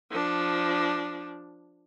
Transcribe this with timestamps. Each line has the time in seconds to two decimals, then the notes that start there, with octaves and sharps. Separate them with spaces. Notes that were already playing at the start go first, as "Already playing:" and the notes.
0.10 F3 D4